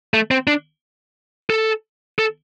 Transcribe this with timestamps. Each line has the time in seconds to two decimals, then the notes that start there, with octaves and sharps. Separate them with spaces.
0.14 A3
0.31 C4
0.47 D4
1.50 A4
2.19 A4